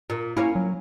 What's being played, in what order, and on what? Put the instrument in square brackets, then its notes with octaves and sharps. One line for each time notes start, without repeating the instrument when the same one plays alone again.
[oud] A#2
[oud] A#3 C#4 [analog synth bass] E4
[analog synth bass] F#3